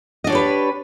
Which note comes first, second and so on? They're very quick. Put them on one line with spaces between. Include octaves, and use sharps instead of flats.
D#5 D4 C#5 G4 B4